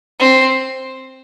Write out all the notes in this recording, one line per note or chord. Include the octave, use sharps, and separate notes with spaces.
C4